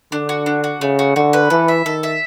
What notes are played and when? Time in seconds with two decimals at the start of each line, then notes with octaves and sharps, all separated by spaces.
0.12 D3 D4
0.29 F#4
0.46 D4
0.64 F#4
0.81 C#3 A3
0.99 F#4
1.16 D3 F#4
1.33 B4
1.50 E3 A4
1.68 E5
1.86 D#3 A4
2.03 E5